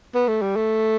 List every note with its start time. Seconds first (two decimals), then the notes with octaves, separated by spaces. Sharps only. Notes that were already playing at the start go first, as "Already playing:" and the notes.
0.15 B3
0.28 A3
0.42 G3
0.56 A3